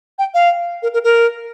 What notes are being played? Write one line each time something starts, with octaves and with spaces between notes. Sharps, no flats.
G5
F5
A#4
A#4
A#4